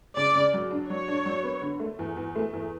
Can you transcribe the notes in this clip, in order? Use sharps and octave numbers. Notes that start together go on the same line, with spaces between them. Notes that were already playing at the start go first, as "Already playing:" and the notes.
C#3 D5
C#3
F#3
D4
F#3 C#5
D4
F#3
B3
D3
A3
E2
E2
A3
E2